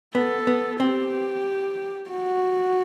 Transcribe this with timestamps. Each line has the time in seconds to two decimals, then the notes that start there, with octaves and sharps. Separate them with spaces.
0.15 B3 A4
0.47 B3
0.80 C4 G4
2.10 F#4